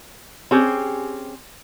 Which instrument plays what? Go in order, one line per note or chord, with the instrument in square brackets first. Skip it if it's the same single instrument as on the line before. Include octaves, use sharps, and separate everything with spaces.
[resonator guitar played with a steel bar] C4 C#4 G4 G#4